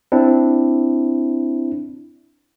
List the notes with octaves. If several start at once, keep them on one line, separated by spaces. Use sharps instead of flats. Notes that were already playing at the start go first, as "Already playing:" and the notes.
C4 D4 E4